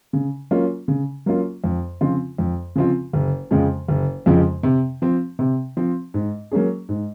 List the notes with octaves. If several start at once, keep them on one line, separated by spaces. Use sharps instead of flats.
C#3
F#3 A#3 C#4 F4
C#3
F#3 A#3 C#4 F4
F2
C#3 F3 C4 F4
F2
C#3 F3 C4 F4
F#1
F2 C#3 F3 G#3
F#1
F2 C#3 F3 G#3
C3
F3 C4
C3
F3 C4
G#2
F#3 A#3 C#4 G#4
G#2